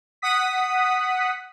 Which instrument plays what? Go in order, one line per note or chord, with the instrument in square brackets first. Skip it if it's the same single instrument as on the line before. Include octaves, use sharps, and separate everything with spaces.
[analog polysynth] F#5 D#6 B6